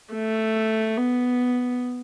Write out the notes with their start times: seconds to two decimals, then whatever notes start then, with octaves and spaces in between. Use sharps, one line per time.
0.14 A3
0.97 B3